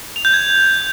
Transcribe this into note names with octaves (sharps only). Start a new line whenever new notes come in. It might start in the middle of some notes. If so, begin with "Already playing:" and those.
F7
G6
G#6